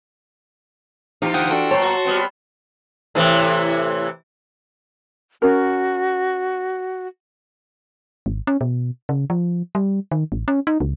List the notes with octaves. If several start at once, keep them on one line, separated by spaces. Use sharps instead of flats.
E3 D#4 F4 G4
D3 C5 F#5 G5 D#6
D4 F#4 A4 G5
A#2 F#3 C5 C#5 A5 C6
F#4
G3 B3 C4
A2 C3 E3
C#4 F#4 A#4
G#1
C#4
B2
C#3
F3
G3
D#3
A1
C#4
D#4
C#2